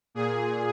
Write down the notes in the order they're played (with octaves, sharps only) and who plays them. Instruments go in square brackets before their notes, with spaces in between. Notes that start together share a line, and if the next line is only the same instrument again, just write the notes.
[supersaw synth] A#2 G#4